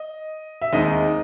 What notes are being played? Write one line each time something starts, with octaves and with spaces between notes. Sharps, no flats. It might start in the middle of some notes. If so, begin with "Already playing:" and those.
Already playing: D#5
E5
D#2 D#3 G#3 C4 D#4 D#5